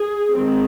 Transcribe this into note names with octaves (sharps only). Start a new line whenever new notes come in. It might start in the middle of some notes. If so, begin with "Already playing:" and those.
Already playing: G#4
D#3 G#3 C4